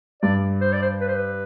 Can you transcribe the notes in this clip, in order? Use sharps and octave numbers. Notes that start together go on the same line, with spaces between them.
G2 D5
C5
D5
C5
B4
C5
B4